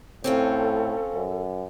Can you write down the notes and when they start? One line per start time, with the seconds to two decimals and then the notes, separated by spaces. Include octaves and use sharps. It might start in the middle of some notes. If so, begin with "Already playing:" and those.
0.24 A2 C4 C#4 F4 A4
1.14 F#2